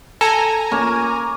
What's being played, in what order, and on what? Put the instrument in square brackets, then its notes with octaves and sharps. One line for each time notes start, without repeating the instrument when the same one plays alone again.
[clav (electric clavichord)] A4 [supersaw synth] G#5 A#5
[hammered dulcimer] A#3 C#4